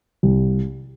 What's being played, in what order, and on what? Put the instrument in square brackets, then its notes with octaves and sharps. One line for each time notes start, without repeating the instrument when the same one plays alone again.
[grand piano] C2